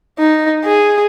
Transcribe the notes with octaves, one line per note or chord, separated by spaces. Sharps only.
D#4
G#4